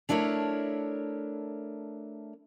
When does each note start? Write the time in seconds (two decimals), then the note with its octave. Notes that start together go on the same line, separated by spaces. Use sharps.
0.09 A3 D4 E4 A#4 C#5